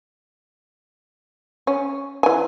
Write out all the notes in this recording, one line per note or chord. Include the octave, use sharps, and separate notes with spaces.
C#4
E3 G#5